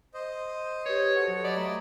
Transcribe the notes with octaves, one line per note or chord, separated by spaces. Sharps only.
C5 D#5
G4 B4 C#5
F#4 A4
F#3 F#4 A4
D5 D#5 A5 B5
A3 A#5